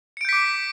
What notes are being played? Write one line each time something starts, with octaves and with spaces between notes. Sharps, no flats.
D6 G6 B6 C#7 D7